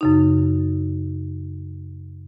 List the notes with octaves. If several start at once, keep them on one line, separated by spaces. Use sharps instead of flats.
F#2 C#3 D#4